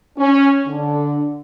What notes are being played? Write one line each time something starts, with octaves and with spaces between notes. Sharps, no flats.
C#4
D3